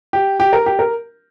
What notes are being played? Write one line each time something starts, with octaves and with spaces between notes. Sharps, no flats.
G4
G4
A#4
G4
A#4